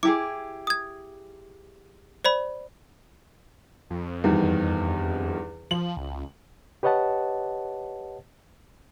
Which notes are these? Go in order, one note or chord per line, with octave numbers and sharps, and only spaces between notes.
E4 G4 G#4 D6
D#6 G#6
C5 D5 B5
F2
E2 G2 D#3
F3 F#7
C#2
G4 B4 C#5 D#5 F#5 A5